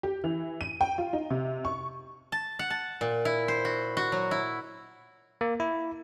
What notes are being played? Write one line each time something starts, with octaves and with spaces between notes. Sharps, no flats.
G4
E3
D#7
G5
F4
D#4
C3
C#6
A5
F#5
A5
A#2
E4
C5
F#4
F#4
F#3
E4
A#3
E4